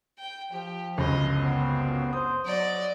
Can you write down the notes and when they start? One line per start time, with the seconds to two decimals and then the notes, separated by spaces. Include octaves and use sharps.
0.19 G5
0.52 F3 G4
0.98 G1 C#2 F#2 D#5
1.39 B3 C4
2.13 C5 D#6
2.45 F#3 D5 D#5